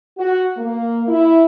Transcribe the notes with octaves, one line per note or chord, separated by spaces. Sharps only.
F#4
A#3
E4